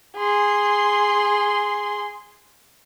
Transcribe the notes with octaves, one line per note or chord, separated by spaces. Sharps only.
G#4 C6